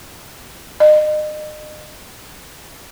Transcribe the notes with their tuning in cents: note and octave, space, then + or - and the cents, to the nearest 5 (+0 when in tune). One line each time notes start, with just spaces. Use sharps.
D#5 -35